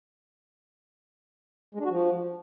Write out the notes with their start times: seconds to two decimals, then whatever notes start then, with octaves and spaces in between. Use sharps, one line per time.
1.75 G#3
1.80 D4
1.85 F#4
1.90 F3